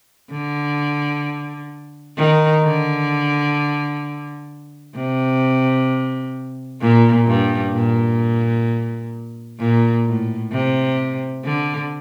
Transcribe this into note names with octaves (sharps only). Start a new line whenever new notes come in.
D3
D#3
D3
C3
A#2
G2
A#2
A#2
A2
C3
D3